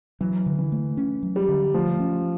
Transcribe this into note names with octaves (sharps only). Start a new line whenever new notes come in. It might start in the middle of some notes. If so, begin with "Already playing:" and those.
E3 F#3
D3
E3
A3
C#4
F#3
G3
D3
F3 A3
C#4